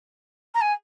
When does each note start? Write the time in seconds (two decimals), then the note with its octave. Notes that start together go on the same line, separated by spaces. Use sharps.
0.54 A#5
0.61 G#5